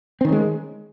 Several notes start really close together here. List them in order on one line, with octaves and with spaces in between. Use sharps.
C4 D#3 C#4 G#3